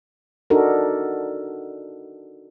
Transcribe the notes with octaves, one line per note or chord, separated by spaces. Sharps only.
D4 D#4 F#4 A4 A#4